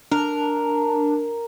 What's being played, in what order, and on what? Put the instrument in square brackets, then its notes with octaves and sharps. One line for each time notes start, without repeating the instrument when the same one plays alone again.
[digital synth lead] D4 [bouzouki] A#4